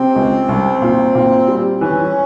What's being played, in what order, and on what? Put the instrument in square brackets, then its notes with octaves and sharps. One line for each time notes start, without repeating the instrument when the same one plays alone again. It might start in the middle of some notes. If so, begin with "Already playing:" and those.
Already playing: [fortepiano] C3 [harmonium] C4
[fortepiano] C#2
C2
A#2
A#2
G3
[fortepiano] E3 [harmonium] C#4